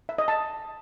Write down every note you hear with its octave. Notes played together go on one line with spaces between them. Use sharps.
E5
D#5
A5